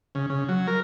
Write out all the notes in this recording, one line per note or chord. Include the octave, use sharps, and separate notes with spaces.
C#3
C#3
F#3
A#4